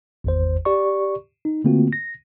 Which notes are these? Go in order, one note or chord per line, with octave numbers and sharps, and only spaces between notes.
G#1 E2 C5
G4 D5 C#6
D#4
D3 A3 A#3 C4 F4 F#4
A#6